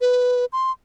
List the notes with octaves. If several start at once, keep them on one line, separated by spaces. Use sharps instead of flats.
B4
C6